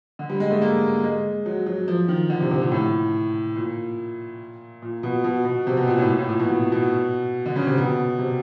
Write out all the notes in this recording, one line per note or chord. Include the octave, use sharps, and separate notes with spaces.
D3
G3
G#3
A3
A#3
G#3
F#3
F#3
F3
D#3
D3
C3
C3
A#2
A2
A#2
A#2
B2
B2
B2
C3
B2
A#2
A2
A#2
A2
A#2
B2
B2
B2
D3
C#3
C3
B2
C3